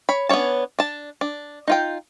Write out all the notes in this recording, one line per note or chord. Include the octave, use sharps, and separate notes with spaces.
C#5 B5
B3 C#4 D4 C#5 A5
D4 A5
D4
D#4 F4 G5